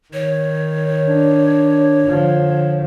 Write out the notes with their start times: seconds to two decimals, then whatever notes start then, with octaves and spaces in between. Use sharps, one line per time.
0.13 D#3 C#5
1.09 D4
2.06 D3 F3